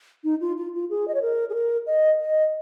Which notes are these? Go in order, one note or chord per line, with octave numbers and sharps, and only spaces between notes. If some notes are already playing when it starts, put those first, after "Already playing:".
D#4
F4
F4
F4
G#4
D#5
C#5
A#4
G#4
A#4
D#5
D#5